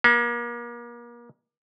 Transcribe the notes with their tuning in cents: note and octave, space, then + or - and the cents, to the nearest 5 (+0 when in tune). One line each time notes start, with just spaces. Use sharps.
A#3 +35